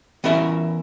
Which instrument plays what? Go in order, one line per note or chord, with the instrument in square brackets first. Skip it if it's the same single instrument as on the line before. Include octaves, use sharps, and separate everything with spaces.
[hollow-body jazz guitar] E3 B3 C#4 A#4 E5